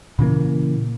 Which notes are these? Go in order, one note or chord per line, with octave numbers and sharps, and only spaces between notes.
A#2 C#3 E3 A#3